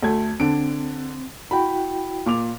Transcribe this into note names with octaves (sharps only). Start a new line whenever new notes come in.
D2 A3 G#6
D3 C4 D4 D7
E4 F#4 G5 B5
A#2 D6 F7